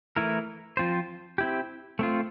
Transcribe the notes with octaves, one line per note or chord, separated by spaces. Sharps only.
E3 A3 E4 A#4
F3 C4 F4 C5
C4 E4 G4
A3 C4 F4